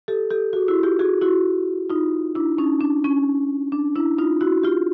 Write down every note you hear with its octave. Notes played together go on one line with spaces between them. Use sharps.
G4 A4
G4 A4
F#4 G#4
E4 F#4
F4 G4
F#4 G#4
E4 F#4
D#4 F4
D4 E4
C#4 D#4
D4
C#4
D4
D4 E4
D#4 F4
E4 F#4
F4 G4